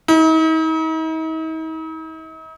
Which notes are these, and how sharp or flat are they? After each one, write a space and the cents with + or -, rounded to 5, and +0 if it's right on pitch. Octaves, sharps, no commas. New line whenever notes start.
D#4 +45